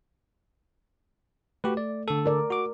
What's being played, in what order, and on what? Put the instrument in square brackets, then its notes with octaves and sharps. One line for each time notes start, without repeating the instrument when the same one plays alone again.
[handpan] A3 [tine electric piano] F#4 G4 B4
[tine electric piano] D5
D3 A4
[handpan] A#4 D5
[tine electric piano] F#4 D6